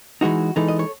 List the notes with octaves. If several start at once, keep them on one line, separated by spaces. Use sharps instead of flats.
E3 G#3 D#4 F#4
E3 G#3 D#4 A4
D#5
C#5